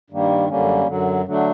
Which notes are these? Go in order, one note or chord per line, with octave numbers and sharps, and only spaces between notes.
G2 D#3 G3 A#3
F#2 D3 G3 A#3 C#4
F#2 D3 F#3
D3 F#3 A3 D4